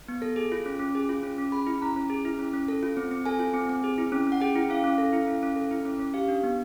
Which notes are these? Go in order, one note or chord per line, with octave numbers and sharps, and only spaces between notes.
B3
A4
G#4
F4
C#4
C#4
G#4
F4
C#4
C#4
G#4 B5
E4
C#4 A#5
C#4
G#4
E4
C#4
C#4
A4
F4
C4
C4
A4 G#5
F4
C4
C4
G#4
E4
C#4
C#4
F#5
G#4 G5
E4
C#4 F5
C#4
A4
E4
C#4
C#4
A4
E4
C#4
C#4
G4 F5
D4
B3